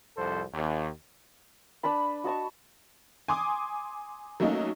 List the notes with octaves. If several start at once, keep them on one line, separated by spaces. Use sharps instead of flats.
C2 F2 A4 C5
D#2
D4 B4 A5 B5
F#4 D#5 A5 C#6
G#5 C6 D6 D#6
F#3 A3 A#3 C#4 D#4